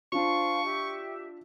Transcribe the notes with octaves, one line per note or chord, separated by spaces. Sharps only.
D4 F4 C5 F5 A5 C#6
G4 E5